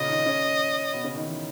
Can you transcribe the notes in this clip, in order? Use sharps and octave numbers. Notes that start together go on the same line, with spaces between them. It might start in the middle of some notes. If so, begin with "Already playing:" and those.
Already playing: A#2 C#3 A#3 C#4 D#5
D#3 D#4
C#3 C#4
B2 B3
C#3 C#4
D#3 D#4
E3 E4